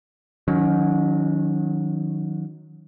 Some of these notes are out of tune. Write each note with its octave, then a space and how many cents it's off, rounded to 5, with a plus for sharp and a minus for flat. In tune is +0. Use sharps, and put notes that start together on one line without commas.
D#3 +0 F#3 -25 C#4 +30